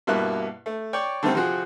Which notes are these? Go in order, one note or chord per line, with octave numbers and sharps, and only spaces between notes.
G2 B2 A#3 E4 F#6
A3
C#5 D5 G5 C#6
D3 D#3 G3 A3 C4
C3 F3 C4 F#4 G#4